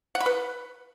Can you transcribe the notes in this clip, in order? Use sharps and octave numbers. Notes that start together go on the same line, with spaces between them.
F#5
B5
B4